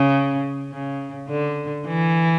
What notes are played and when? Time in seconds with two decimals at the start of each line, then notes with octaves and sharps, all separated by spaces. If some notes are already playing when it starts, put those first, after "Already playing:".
Already playing: C#3
0.72 C#3
1.29 D3
1.86 E3